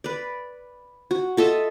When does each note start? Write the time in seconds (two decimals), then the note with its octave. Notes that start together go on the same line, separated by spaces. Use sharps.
0.04 B4 D5
1.11 F#4
1.37 F4 A4 D#5 E5